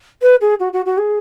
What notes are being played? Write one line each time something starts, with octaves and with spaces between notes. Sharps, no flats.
B4
G#4
F#4
F#4
F#4
G#4